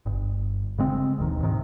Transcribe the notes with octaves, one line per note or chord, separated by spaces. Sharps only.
G1
C#3 G#3 C4
E1 D#2 D#3
D#2 G#2 C3 D#3